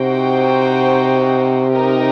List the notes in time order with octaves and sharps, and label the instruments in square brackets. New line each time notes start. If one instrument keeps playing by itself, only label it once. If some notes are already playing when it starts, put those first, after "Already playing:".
Already playing: [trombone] C3 [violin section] D#4 F#4 C5 G5
[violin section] D#4 G4 A#4